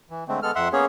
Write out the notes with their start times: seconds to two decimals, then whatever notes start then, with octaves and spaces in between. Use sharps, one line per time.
0.10 E3
0.28 D3 G#3 A3 C4
0.43 G#3 B3 A4 F6
0.55 F2 E5 F#5 C6
0.73 A#3 B3 C#4 G#4 C#5